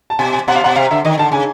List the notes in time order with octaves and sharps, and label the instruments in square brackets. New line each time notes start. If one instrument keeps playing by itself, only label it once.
[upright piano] A5
[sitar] B2 [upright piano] G#5
[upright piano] G#5
[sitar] B2 [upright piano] F#5
[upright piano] F5
[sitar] B2 [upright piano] F#5
[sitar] C3 [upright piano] F5
[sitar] D3 [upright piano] E5
[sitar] D#3 [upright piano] D#5
[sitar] D3 [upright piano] A5
[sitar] C#3 [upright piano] G#5